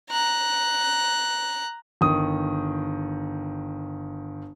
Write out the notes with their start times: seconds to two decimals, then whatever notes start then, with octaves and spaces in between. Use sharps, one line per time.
0.10 A#5 F#6
2.01 G1 D#3 D#6